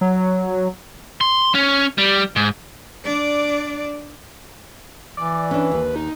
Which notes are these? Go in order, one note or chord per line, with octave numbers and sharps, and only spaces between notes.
F#3
C6
C#4
G3
G#2
D4 D5
E3 D5
C#4 D4 B4
D#2
D#4